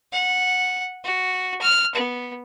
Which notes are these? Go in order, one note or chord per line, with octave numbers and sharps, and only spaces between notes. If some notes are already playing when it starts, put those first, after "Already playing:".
F#5
F#4
F6
B3